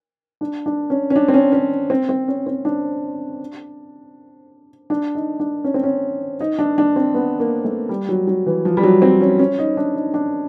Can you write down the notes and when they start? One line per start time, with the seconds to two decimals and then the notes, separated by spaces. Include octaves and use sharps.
0.41 D4
0.66 D4
0.90 C#4
1.10 C#4
1.16 D4
1.28 C4
1.34 C#4
1.52 C#4
1.90 C4
2.09 C4
2.28 C#4
2.47 C4
2.65 D4
4.90 D4
5.15 D#4
5.40 D4
5.64 C#4
5.74 C4
5.83 C#4
6.40 D#4
6.59 D4
6.78 D4
6.96 C4
7.14 B3
7.40 A#3
7.64 A3
7.89 G3
8.09 F#3
8.27 F#3
8.46 E3
8.65 F3
8.77 G3
8.83 F#3
9.02 C4
9.21 C#4
9.39 C#4
9.59 D#4
9.77 D4
9.95 D#4
10.14 D4